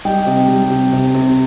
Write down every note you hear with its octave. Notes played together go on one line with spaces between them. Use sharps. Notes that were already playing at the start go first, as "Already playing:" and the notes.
G3 D#5 G5
C3
G3
C3
C3
C3